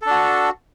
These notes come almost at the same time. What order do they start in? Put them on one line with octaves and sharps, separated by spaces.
A4 D4 F#4